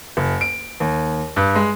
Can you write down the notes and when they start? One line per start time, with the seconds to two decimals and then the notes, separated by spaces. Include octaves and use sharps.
0.17 F#1
0.41 D7
0.80 D#2
1.36 G2
1.55 G#3